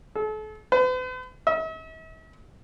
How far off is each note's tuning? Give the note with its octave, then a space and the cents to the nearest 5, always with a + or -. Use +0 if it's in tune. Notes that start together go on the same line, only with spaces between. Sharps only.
A4 -40
B4 +45
E5 -45